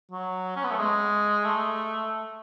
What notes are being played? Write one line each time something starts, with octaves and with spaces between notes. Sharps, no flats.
F#3
C#4
B3
A3
G#3
A3